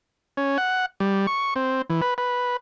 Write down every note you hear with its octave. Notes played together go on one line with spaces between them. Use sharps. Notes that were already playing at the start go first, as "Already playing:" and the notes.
C#4
F#5
G3
C#6
C4
E3
B4
B4